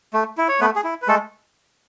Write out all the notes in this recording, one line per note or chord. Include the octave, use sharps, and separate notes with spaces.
A3
E4
C#5
A3 B3 B4
G#4
E4
B4
G#3 A3 A4